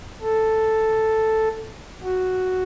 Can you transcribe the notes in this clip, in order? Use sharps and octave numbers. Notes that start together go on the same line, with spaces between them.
A4
F#4